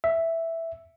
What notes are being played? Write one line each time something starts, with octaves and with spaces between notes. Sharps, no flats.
E5